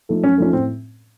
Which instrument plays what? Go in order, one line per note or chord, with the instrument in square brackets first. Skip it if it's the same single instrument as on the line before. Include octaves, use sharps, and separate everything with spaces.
[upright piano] F3 A3 D#4 A4
[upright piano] F#2 [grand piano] C#4
[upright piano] F3 A3 D#4 A4 [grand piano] C#4
[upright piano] A2 [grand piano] C4